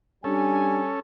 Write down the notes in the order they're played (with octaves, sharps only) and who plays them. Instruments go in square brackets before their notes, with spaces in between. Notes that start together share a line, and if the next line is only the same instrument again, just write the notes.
[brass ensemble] G3 G#5 [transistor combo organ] C#4 A4 [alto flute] D4